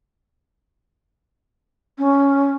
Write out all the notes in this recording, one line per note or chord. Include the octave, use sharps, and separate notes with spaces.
C#4